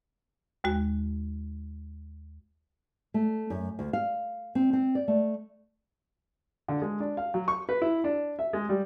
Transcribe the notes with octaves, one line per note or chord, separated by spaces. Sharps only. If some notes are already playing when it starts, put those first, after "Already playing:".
D#2 G#3 F#4
A3
F#2
D2
F5
C4
C4
D5
A3
D3
G#3
D4
F5
F#3
C#6
B4
E4
D4
E5
G#3
G3